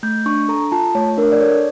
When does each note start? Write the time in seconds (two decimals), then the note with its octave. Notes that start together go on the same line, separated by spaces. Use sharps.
0.03 A3 G6
0.26 D4 C#6
0.49 A4 A#5
0.72 F4 A5
0.95 A3 C#5
1.17 D4 A#4
1.32 D5
1.40 A4 C#5